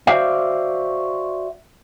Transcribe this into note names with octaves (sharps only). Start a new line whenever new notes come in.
F#4 C5 D5 E5 F5